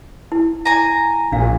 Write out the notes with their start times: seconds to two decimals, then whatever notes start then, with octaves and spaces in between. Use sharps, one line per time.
0.32 E4
0.65 G#5 A#5
1.32 A#1 D4 F5